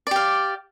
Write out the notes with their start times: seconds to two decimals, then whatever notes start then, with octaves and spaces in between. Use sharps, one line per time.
0.07 D5
0.11 G4
0.16 F5